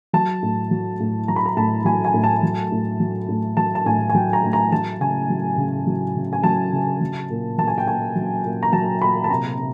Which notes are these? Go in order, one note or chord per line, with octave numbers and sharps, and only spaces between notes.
F#3 A5
A2
F#3
A2
F#3 A#5
B5
A#5
A2 A5
F#3 G#5
G#5
A2
A5
F#3
A2
F#3
A2
F#3 A5
A5
A2 G#5
G#5
F#3 G5
A#5
A2
A#5
F#3 A5
C#3 G#5
F#3
C#3
F#3
C#3
G#5
F#3 A5
C#3
F#3
A#2
F#3 A5
G#5
G5
A#2 G#5
F#3
A#2
A#5
F#3 A5
A#2 B5
A5
C3 A#5
C3